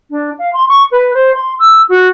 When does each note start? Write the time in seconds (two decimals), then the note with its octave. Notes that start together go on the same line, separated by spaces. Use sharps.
0.10 D4
0.38 F5
0.53 C6
0.68 C#6
0.91 B4
1.13 C5
1.34 C6
1.59 E6
1.88 F#4